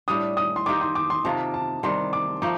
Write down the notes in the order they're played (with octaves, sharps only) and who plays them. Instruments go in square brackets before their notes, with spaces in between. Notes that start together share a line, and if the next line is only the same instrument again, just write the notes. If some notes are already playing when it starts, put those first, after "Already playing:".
[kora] A2 G3 D4 [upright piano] D#6
[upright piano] D#6
C6
[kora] D#3 A#3 D#4 G4 [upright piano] D6
[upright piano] C6
D6
C6
[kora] C3 D#3 A#3 F4 [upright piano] A5
[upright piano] A5
[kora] C3 D#3 G3 [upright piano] C6
[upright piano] D6
[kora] F3 A3 D#4 [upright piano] D6